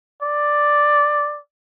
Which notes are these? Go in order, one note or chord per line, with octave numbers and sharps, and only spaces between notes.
D5